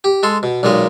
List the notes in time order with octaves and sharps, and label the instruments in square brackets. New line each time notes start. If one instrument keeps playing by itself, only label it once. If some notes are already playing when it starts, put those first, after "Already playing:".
[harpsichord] G4
G#3 A4 C6
B2
B1 A#2 D#3 G#3 D#5